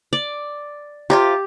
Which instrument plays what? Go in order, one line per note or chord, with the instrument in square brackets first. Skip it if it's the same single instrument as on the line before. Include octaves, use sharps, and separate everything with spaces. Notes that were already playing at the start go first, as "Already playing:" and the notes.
[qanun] D5
[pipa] C3 D#4 F4 [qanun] G4